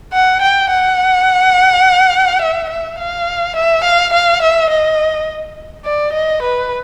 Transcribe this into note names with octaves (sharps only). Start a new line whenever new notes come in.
F#5
G5
F#5
E5
E5
F5
E5
F5
F5
E5
D#5
D5
D#5
B4